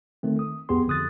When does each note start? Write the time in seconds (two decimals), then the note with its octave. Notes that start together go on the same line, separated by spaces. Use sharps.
0.23 D#3 A3 C4
0.39 D#6
0.69 F2 B3 G4 G#4 C6
0.87 F2 D3 D#6 F#6 A6